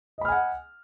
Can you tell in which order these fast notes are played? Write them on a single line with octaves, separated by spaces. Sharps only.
D#5 B5 F6 G#5 F#5